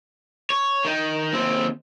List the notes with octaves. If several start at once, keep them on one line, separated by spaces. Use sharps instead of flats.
C#5
D#3 D#4
D#2 C4